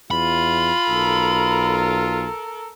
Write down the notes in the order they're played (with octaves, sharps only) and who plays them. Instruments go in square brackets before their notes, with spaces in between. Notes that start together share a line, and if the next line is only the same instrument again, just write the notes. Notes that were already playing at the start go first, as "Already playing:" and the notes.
[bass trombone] E2 [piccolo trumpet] F4 [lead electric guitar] B5
[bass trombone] B1 [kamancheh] A4 A#4